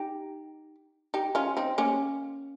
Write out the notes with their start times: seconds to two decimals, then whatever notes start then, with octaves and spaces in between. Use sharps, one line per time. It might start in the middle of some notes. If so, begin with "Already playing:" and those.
Already playing: D#4 G4
1.14 D#4 G4
1.35 C#4 F4
1.57 C4 D#4
1.78 A#3 C#4